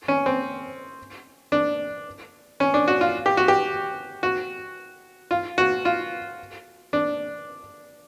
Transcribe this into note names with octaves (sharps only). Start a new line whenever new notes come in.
C#4
C4
D4
C#4
D4
F#4
F4
G4
F#4
G4
F#4
F4
F#4
F4
D4